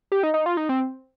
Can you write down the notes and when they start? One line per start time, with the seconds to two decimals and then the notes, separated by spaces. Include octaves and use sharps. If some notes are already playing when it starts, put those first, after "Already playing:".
0.12 G4
0.23 D#4
0.34 D#4
0.46 F4
0.57 D#4
0.69 C4